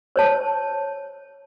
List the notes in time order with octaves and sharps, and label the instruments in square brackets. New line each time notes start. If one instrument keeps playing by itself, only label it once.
[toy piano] C5 C#5 A5